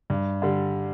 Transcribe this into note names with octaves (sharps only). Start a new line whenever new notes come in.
G2
D3 G3